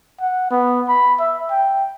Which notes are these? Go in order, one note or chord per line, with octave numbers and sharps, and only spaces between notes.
F#5
B3
B5
E5
G5